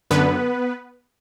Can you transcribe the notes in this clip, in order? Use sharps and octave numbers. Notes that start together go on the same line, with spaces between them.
F#2 D3 B3 B4